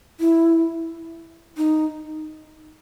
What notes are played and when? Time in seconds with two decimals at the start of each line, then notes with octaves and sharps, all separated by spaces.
0.20 E4
1.57 D#4